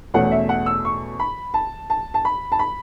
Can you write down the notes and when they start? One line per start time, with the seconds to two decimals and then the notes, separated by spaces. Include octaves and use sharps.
0.14 E2 B2 A3 C#4 F#5
0.31 E5
0.49 F#5
0.66 E6
0.85 C#6
1.19 B5
1.54 A5
1.90 A5
2.14 A5
2.25 B5
2.52 A5
2.59 B5